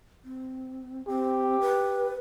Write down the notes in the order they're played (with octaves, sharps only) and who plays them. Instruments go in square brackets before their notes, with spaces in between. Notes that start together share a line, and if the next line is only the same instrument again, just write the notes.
[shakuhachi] C4
[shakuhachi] C4 [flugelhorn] G4
[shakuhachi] B4